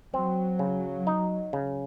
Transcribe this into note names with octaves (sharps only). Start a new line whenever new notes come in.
F#3 C4
C#3
D#4
C#3